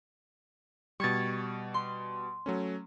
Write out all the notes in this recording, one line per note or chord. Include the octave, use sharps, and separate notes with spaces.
B2 G3 C#6 G#6 A6
C6
F#3 A3 C#4